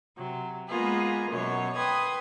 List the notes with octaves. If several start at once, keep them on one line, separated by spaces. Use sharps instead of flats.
C3 F#3
G#3 A#3 B3 F4 G#4
F#2 B2 F#3 C#5
B4 G5 C6 D#6 G#6